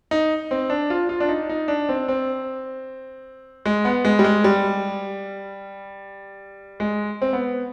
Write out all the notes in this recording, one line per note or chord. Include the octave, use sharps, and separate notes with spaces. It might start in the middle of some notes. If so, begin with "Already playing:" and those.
D#4
C4
D4
F4
F4
D4
D#4
D#4
D4
C4
C4
G#3
B3
G#3
G3
G#3
G3
G#3
C4
B3